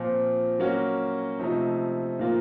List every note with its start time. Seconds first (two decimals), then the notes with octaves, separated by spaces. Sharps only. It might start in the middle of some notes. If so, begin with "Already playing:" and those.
Already playing: A#2 F3 C4
0.59 F#3 A#3 C#4 F#4
1.39 C3 F3 A3 D#4
2.19 A#2 F3 A#3 F4